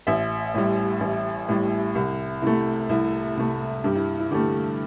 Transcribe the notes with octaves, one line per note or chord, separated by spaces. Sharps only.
A1 E5
A2 G3
A1
A2 G3
C2
C3 A3 E4
C2 E4
C3 A3
G2 G4
E4
E4
D3 A3 G4